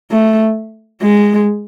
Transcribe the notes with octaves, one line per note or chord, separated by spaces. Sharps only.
A3
G#3